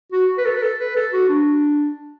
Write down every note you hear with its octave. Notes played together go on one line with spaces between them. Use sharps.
F#4
B4
A4
B4
A4
B4
A4
F#4
D4